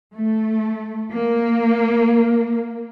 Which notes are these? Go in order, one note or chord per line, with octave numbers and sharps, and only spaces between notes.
A3
A#3